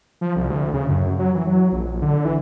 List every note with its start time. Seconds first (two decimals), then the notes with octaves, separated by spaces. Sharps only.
0.21 F3
0.36 C2
0.50 D2
0.74 C#3
0.89 F#2
1.19 F#3
1.35 E3
1.47 F#3
1.72 A#1
2.02 D3
2.25 E3